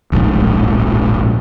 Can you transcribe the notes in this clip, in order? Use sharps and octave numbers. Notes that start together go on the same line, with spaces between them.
D1 A#1 G#2